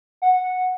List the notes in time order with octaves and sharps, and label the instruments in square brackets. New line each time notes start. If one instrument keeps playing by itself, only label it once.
[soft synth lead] F#5